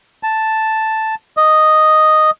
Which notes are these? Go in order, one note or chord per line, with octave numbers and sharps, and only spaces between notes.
A5
D#5